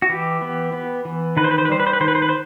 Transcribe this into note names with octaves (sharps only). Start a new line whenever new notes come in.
F#4
E3 G4
B3
B3
E3
D#3 B4
C5
B4
C5
B4
G3 C5
B4
C5
B4
D#3 C5
B4
C5
B4
C5